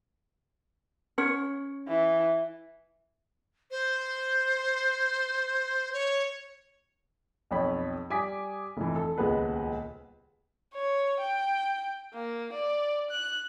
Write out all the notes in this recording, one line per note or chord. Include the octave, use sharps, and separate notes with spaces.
C#4 C#5
E3
C5
C#5
B1 F2 C#5 B5
G3 G#5 D6 D#6 B6
F1 E3
A4
D#1 C#2 G#3 B3 B4
C#5
G5
A#3
D5
F#6